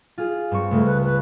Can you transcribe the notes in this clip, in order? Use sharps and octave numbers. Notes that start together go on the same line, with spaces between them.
F4 G#4
G2 C4 C#6
C#2 C#3 A3
B4
B4